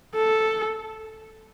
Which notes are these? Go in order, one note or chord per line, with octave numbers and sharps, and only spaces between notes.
A4